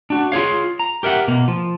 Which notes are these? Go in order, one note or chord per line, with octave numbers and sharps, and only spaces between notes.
D4 F#4
F4 G#4 C#5 F5
A#5
G4 A#4 E5 F#5
B2 A#3
F3